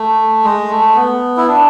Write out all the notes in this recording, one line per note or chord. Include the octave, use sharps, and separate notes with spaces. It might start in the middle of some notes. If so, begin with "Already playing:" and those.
Already playing: A3
G#3
A3
B3
E4
D4